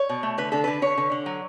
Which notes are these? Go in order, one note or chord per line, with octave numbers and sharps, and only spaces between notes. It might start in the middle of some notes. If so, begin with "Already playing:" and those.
Already playing: C#5
B2
A3
D3 B4
D3 A4
D3 B4
D3 C#5
D3
D3
F#3